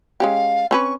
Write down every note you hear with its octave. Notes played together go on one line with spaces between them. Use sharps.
G#3 C#4 G4 F5
C4 C#4 B4 C#6